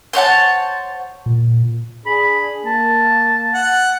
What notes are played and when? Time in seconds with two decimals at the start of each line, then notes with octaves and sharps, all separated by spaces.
0.13 C5 C#5 F#5 A5
1.26 A#2
2.06 D4 G#4 B5
2.65 A#3 A5
3.54 F#5